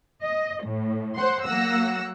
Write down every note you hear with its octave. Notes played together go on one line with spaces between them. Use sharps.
D#5
A2
C5 F#5 C6
F#3 A#3 F#5 E6 A#6